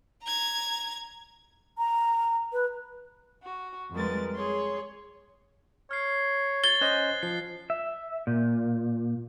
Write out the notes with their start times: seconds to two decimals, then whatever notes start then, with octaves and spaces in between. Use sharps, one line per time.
0.23 A#5 G#6
1.78 A#5
2.53 B4
3.43 F#4
3.93 F2 G3 G#3 A#4 B4 A6
4.35 G#4 C#5 C6
5.91 C#5 F6 C7
6.64 G#6 A6 G7
6.81 C#4 C5 D#5 F#6
7.23 F3 C7
7.70 E5
8.27 A#2